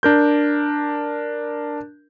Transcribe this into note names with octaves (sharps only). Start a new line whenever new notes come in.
D4 A#4 G6